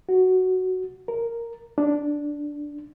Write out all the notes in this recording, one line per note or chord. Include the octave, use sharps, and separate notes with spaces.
F#4
A#4
D4